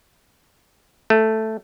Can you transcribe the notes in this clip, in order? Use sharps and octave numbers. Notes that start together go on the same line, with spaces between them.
A3